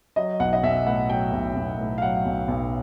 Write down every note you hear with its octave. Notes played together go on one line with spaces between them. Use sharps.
F#3 D#5
B1 F#5
D#5
B1 E5
A2 F#5
F#3 G5
B1
B1
A2
F5
F#3 F#5
B1
B1